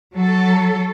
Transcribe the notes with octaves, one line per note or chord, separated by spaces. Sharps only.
F#3 A4